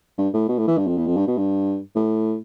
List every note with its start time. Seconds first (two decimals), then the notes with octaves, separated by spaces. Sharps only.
0.18 G2
0.34 A2
0.48 B2
0.58 A2
0.67 E3
0.78 G2
0.87 F2
0.98 E2
1.07 F2
1.17 G2
1.27 B2
1.37 G2
1.96 A2